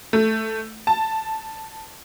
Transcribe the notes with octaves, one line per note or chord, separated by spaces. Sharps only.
A3
A5